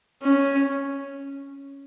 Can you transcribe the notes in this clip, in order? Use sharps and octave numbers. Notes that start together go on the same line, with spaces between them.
C#4